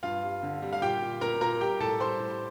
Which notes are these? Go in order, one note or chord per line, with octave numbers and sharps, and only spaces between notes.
G2 F4 F5
G3
D3
G3
F5
A#2 G4 G5
A#2
A#2 A#4 A#5
A#2 A#4 A#5
G3 G4 G5
A2 A4 A5
G3 C5 C6
A2